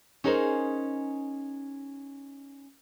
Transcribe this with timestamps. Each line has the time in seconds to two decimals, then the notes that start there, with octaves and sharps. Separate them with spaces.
0.24 C#4 D#4 G#4 A#4 C5